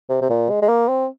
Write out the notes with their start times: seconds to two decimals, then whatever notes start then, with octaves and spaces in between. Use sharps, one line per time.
0.09 C3
0.21 C3
0.30 A#2
0.50 G#3
0.62 G#3
0.69 A#3
0.88 C4